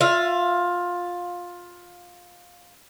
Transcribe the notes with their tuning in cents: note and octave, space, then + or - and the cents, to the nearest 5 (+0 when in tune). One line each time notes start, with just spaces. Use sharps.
F4 +15 E5 +35